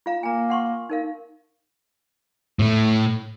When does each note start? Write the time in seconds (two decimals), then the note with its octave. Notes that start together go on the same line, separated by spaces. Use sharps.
0.06 F4 F5 A#5
0.23 A#3 G#5 A#5
0.50 F#5 C6 C#6
0.90 D#4 A#4 F5
2.59 A2 A3